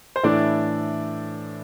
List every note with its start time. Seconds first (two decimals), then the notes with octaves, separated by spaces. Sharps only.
0.16 C5
0.23 A2 E3 A3 D4 E4 D5